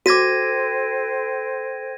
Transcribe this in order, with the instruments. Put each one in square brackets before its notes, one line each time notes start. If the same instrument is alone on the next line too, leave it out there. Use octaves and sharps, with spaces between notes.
[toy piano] F#4 D6 [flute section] A4 C5 G5 [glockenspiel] G#6 A#6 D#7